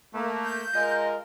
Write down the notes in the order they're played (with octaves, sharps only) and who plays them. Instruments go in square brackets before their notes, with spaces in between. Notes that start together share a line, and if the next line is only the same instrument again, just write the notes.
[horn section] A3 A#3
[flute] G6
[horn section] G#3 F4 A#4 [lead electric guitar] D#5